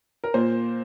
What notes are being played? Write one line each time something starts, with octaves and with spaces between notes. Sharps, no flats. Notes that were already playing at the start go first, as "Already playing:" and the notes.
A#4
A#2 A#3 C5